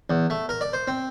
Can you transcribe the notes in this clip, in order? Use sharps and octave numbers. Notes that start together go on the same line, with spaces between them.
E2
A3
A#4
D5
C5
C4